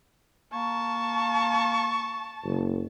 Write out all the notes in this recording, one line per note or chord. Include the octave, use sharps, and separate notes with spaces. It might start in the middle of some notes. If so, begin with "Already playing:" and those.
A#3 A5 C#6
F#1